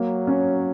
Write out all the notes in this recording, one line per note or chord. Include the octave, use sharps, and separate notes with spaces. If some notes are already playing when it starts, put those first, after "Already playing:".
Already playing: F#3 A#3
C#4